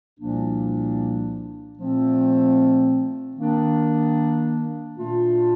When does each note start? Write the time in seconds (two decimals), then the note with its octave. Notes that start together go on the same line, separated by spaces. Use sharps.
0.18 C2 A#2 F3 A#3 D4
1.77 A#2 F3 A3 C4
3.36 D#3 A#3 D4
4.94 A#2 A3 D4 F4